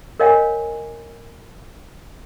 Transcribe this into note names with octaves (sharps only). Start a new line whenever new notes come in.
A#4 C#5 D#5 F5 G5 G#5